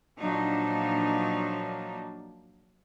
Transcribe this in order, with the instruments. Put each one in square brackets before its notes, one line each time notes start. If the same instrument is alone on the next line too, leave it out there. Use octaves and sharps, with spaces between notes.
[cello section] A#2 F3 F#3 D4 D#4